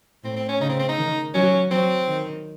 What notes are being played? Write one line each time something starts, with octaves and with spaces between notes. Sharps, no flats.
A2 C4
C4
C#4
C#3 D#4
C4
C4
D#4
D#3
F#3 C#4
F#3 C4
D#3